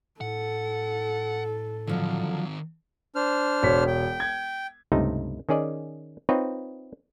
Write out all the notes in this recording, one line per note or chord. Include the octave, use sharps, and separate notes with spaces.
A2 A4 F#5
D3 D#3 F3 F#3 C4
D4 C5 F6
E1 C#5 B6
G5
G#6
C#2 G2 C3 A3 D#4
D#3 C#4 G#4 D5 D#5
C4 D#4 F4 B4 C#5 D#5